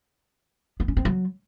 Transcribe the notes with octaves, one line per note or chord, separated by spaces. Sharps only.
B3
C#4
C4
F#3